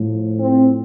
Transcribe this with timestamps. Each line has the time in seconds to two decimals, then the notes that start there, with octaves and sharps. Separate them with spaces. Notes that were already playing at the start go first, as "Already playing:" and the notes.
Already playing: A2 F3
0.39 C4